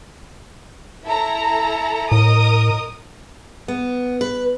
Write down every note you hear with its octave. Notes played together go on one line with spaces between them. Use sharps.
E4 A4 A#5
A2 A#4 D#5 D#6
B3
B4